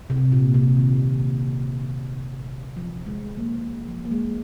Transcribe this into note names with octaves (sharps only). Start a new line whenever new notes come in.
C3
A#2
C3
D#3
F3
G#3
A#3
F3
A#3
G#3